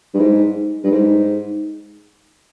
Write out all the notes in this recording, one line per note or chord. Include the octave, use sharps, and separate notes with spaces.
G2
G#2
G2
G#2